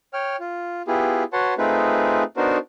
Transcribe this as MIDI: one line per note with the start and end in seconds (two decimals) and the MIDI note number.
0.14 0.36 73
0.14 0.36 79
0.14 0.36 89
0.40 0.82 65
0.88 1.24 59
0.88 1.24 64
0.88 1.24 65
0.88 1.24 67
0.88 1.24 68
1.33 1.54 66
1.33 1.54 71
1.33 1.54 73
1.33 1.54 78
1.33 1.54 81
1.33 1.54 84
1.58 2.23 57
1.58 2.23 60
1.58 2.23 63
1.58 2.23 65
1.58 2.23 68
1.58 2.23 71
2.37 2.58 59
2.37 2.58 62
2.37 2.58 63
2.37 2.58 66
2.37 2.58 70
2.37 2.58 72